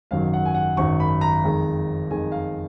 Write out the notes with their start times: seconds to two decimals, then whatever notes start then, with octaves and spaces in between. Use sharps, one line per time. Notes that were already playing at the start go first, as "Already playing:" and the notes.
0.11 G#1 F#2 D#3 F#3 F5
0.34 F#5
0.45 G#5
0.54 F#5
0.77 G#1 F#2 D#3 F#3 C#6
1.00 B5
1.21 A#5
1.44 F2 D#3 G#3
2.10 F2 D#3 G#3 G#5
2.32 F5